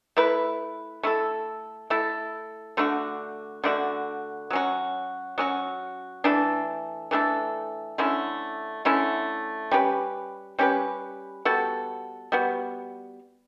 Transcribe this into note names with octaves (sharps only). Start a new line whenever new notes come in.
A3 E4 B4
A3 E4 A4
A3 E4 A4
D3 A3 D4 F#4
D3 A3 D4 F#4
F#3 C#4 F#4
F#3 C#4 F#4
E3 A3 D4 A4
E3 A3 D4 A4
D3 A3 C#4 E4
D3 A3 C#4 E4
G3 C#4 G4 B4
G3 C#4 G4 B4
G3 B3 F#4 A4
G3 B3 F#4